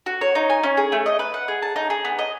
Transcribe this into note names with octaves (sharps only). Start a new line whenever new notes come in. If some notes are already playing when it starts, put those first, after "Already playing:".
F#4
C#5
D#4
G#5
C#4
G#4
A3
D#5
B4
F#5
G#4
A5
D#4
G#4
B3
D#5